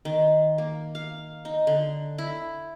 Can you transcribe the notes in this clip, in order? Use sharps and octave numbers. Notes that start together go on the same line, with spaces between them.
D#3
A#3
F5
D#4
D3
E4